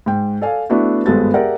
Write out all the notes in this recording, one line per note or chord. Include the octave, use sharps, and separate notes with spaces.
G#2 G5
A4 D5 F5 G#5
A3 B3 D4 E4 F#4
G#1 G2 G#3 B3 A4 A6
G4 G#4 A#4 D5 E5 F#5